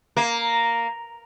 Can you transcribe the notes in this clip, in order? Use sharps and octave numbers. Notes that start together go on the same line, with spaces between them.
A#3